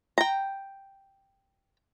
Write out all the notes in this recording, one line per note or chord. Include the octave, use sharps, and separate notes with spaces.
G5 A#5